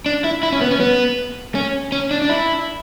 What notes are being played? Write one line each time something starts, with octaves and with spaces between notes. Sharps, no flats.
D4
E4
E4
C#4
B3
C#4
B3
C#4
C#4
D4
D4
E4